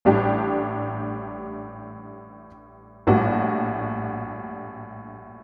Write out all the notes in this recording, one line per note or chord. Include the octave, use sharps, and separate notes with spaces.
A1 A2 G3 D4 G4
A#1 A2 G3 D4 F#4